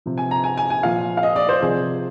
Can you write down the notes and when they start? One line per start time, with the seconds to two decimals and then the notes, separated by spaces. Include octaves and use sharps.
0.06 C3 F3
0.18 G#5
0.31 A#5
0.44 G#5
0.57 G#5
0.70 G#5
0.83 A#2 F3 F5
1.17 F5
1.23 D#5
1.36 D5
1.49 C5
1.62 C3 F3 G#4